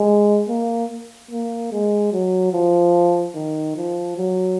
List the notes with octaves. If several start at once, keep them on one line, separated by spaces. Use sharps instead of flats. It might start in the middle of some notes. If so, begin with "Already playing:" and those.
Already playing: G#3
A#3
A#3
G#3
F#3
F3
D#3
F3
F#3